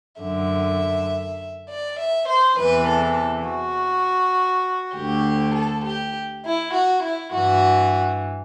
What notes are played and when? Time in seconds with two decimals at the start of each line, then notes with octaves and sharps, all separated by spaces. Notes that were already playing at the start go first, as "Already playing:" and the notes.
0.21 F#2 D3 E5
1.70 D5
2.00 E5
2.29 C5
2.59 E2 C3 E3 B4
2.89 A4
3.48 F#4
4.96 D2 D3 G4
5.57 A4
5.86 G4
6.46 E4
6.75 F#4
7.04 E4
7.34 G2 E3 F#4